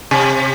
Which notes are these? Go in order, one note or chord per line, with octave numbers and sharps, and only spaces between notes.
C3